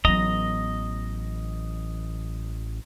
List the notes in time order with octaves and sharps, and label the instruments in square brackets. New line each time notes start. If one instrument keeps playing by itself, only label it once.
[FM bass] A1 [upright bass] F#3 B3 [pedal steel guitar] D#5 A#5